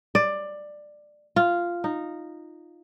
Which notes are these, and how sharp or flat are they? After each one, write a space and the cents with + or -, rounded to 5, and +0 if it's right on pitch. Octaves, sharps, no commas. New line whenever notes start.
D5 +15
F4 -5
D#4 -10